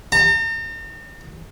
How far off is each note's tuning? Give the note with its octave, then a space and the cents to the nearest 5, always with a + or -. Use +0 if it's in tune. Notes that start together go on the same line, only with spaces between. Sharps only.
A#5 -45